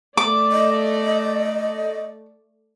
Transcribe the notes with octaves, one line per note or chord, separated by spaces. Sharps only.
A3 D5 D6
D#5